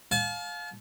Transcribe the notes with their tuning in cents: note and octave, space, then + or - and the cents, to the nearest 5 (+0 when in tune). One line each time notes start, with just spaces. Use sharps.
F5 +20 A5 -40